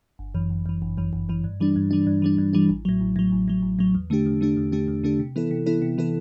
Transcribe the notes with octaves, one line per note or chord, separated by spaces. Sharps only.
G1
F#2 E3
G1
F#2 E3
G1
F#2 E3
G1
F#2 E3
G2
E3 G3 D4
G2
E3 G3 D4
G2
E3 G3 D4
G2
E3 G3 D4
A1
A2 F#3
A1
A2 F#3
A1
A2 F#3
A1
A2 F#3
E2
D3 A3 D4 G4
E2
D3 A3 D4 G4
E2
D3 A3 D4 G4
E2
D3 A3 D4 G4
C3
E3 B3 E4 A4
C3
E3 B3 E4 A4
C3
E3 B3 E4 A4